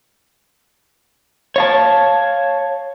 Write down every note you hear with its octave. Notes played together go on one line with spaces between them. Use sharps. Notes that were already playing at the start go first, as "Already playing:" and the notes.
C#5 F5 A5